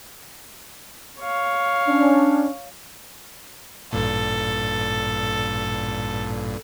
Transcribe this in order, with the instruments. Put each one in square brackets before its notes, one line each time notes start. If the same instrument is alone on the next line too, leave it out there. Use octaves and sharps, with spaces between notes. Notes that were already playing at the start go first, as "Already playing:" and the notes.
[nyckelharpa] C#5 F5
[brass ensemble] C#4 D4
[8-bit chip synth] A1 G2 A#2 [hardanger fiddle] A4